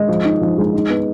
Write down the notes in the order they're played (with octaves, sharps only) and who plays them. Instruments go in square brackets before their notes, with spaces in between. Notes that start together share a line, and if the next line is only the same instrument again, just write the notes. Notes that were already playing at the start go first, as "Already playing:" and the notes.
Already playing: [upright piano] G#3 D#5
F3
D#4
F3
G#3
D#4
B3